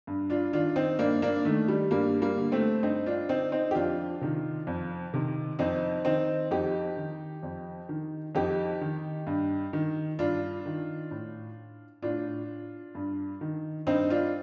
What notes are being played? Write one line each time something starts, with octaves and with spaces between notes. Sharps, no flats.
G2
D4 F4
D#3 D4 F4
C4 D#4
G2 A#3 D4
A#3 D4
D#3 A3
G3
G2 G3 A#3
G3 A#3
D3
A3 C4
G2 C4 D#4
D4 F4
D3 C4 D#4
C4 D#4
G4
F2 D4 F4
C3 D#3
F2
C3 D#3
F2 C4 D#4
D#3 C4 D#4
F2 D#4 G4
D#3
F2
D#3
F2 D#4 G4
D#3
G2
D#3
G2 D4 F4
D#3
A2
A2 D4 F4
G2
D#3
G2 C4 D#4
D4 F4